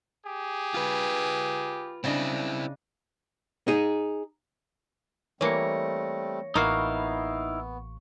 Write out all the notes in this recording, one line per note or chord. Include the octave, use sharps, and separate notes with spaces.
G4 G#4
F4 B4
C#3 C4 D4 E4 D#5
D#4 G#4
E3 G3 A3 A#3 C4 C#5 A#6 C#7
A1 A#3 B3 D#4 E4 F#4 F5 C#6